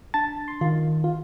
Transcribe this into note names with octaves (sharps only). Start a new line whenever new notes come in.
D4 A5 A6
C6
D#3 F4
F4